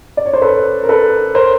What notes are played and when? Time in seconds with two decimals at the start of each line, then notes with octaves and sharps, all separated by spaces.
0.17 D5
0.26 C#5
0.33 C5
0.42 A4 B4
0.83 A#4
0.89 A4 B4
1.35 A#4 C5